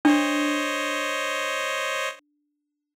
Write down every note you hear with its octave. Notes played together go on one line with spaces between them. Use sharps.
D4 C5 C#5 D#5